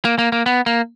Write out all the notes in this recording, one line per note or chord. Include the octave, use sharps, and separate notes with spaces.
A#3
A#3
A#3
B3
A#3